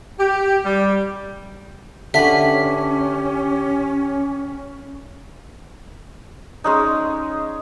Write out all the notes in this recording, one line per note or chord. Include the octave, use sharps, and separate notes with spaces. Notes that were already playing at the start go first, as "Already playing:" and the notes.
G4
G3
D3 C#4 G4 B4 E5 B6
G#3 C#4 D#4